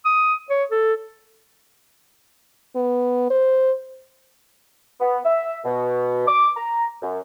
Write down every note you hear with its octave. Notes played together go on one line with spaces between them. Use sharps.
D#6
C#5
A4
B3
C5
B3
E5
B2
D6
A#5
F#2